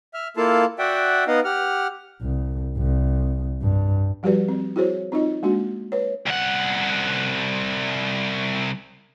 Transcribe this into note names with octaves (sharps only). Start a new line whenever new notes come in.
E5 F6
A#3 E4 F4 A4 F5 A5
F#4 D5 E5 F#5 G5
B3 D#4 D#5 F5 F#5
G4 F#5 F6
C2
C2
G2
F3 G3 F#4 G4 B4 D5
C4
E4 F#4 G#4 C5 C#5
C4 D#4 F4 D#5
G#3 A#3 D4 F#4
B4 C#5
C2 F#5